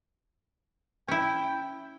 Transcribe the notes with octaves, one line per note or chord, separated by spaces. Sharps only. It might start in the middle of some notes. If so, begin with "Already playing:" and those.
C#4 E4 G5